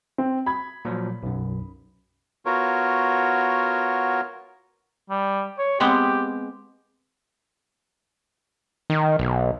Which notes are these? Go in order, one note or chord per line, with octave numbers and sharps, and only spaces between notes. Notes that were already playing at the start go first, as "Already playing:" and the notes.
C4
B5 G#6
A#2 F3 F#3
B1 F#2
B3 F4 F#4 A#4 C#5
G3
C#5
G#3 B3 C4 G4
D#3
B1